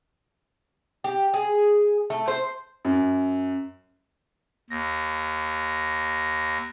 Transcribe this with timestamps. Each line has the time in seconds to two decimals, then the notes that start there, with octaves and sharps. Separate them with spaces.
1.04 G4
1.34 G#4
2.10 A3
2.28 C5
2.85 F#2
4.70 D#2 A#6